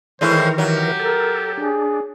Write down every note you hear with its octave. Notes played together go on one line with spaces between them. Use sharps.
A2 D#3 E3 G#3 E4 A#4 C5
F#3 G4
A4 A#4
D4 G#4